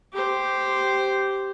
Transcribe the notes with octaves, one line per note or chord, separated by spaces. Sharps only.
G4 C5